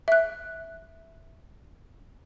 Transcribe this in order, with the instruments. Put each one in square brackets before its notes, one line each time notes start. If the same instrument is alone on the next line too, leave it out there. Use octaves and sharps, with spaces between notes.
[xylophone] E5 F#6